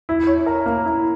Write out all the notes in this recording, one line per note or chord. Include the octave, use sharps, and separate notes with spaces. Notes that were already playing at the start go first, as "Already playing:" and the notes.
E4
C#5
A#4
A#3
E4